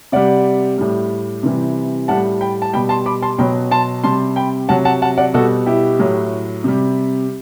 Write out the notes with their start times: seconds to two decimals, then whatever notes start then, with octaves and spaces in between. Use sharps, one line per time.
0.12 C3 G3 D5 F#5
0.78 A2 G3
1.43 C3 E3 G3
2.08 A2 G3 F#5 A5
2.41 G5 B5
2.62 A5
2.73 B2 G3 G5 B5
2.89 A5 C6
3.06 B5 D6
3.22 A5 C6
3.38 B2 F#3 G5 B5
3.71 A5 C6
4.04 C3 G3 A5 C6
4.36 G5 B5
4.69 C3 F#3 F#5 A5
4.85 F#5 A5
5.02 F#5 A5
5.17 D5 F#5
5.34 B2 G3 F#4 A4
5.66 E4 G4
5.99 A2 F#3
6.64 C3 G3